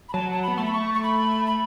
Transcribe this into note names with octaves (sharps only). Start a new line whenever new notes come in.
B5
F#3 A5
A5
B3 B5
A3 A5
B5
C#6
C#6
B5
B5